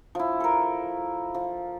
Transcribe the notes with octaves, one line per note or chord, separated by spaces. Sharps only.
F3 E4
A4 A#4
F3